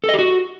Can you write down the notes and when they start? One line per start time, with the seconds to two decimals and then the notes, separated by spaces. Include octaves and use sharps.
0.04 A4
0.09 D#5
0.14 G4
0.19 F#4